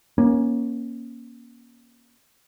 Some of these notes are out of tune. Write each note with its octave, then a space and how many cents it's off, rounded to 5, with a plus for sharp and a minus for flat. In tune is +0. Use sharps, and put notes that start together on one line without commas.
A#3 +25 C#4 +0